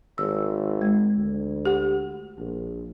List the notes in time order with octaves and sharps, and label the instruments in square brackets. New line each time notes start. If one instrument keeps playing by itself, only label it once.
[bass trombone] G#1 [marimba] E6
[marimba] G#3
[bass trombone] D2
[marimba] G4 F#5
[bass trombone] A#1